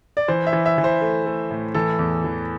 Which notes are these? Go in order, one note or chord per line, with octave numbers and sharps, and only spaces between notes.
D5
E3 C5
E5
E3
E5
E3
C5
A3
A3
A2
E3 A4
E2
E3